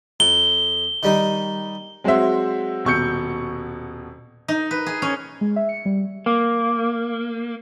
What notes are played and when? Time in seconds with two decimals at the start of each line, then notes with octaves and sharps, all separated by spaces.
0.20 F2 G7
1.03 D#3 G3 D#4
2.04 F#3 G#3 C4 F#4 C5 E5
2.85 D#1 B2 C#6 E6 G6 C#7
4.48 D#4
4.71 B4
4.86 G#4
5.02 C#4
5.41 G#3
5.56 E5
5.69 C#7
5.86 G3
6.26 A#3